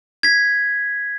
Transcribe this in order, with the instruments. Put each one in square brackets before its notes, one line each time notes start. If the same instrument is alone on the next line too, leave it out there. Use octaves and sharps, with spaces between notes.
[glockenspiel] G#6 B6